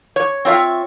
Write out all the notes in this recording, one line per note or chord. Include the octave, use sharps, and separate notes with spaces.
C#5
C4 F4 C#5 E5